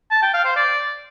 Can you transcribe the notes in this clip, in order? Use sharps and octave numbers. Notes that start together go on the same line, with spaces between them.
A5
G5
F5
C5
D5